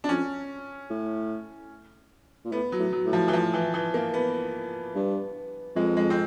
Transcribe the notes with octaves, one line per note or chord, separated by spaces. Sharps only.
D4
F2 C#4
A2
A#2
A2 B3
F#3
A2
F#3
A2
F3
E3
F3
E3
E3
A#3
B3
G2
F2 G#3
G#3
C4